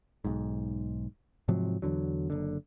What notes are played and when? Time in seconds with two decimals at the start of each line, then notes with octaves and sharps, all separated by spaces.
0.25 B1 G#2
1.48 G#2 C3 F3 F#3
1.82 E2 D3 F#3
2.30 F#1 D3